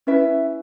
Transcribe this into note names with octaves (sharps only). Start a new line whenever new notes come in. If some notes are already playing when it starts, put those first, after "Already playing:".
C#4 E4 B4 E5